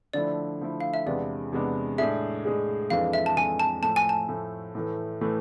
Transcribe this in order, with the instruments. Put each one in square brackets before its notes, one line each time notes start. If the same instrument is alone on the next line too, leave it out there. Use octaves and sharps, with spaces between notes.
[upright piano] D3 F3 A3 E4 [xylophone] D5
[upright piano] D3 F3 A3 E4
[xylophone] F5
E5
[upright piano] E2 C3 G#3 B3 D4 [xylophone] D5
[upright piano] E2 C3 G#3 B3 D4
[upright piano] A2 G#3 D4 G#4 [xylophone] E5
[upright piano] A2 G#3 D4 G#4
[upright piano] F2 E3 G#3 D4 A4 [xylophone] F5
[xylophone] E5
A5
[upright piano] F2 E3 G#3 D4 A4 [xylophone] G#5
[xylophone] A5
[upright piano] A2 F3 A3 [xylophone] A5
[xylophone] G#5
A5
[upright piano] A2 F3 A3
A2 E3 A3
A2 E3 A3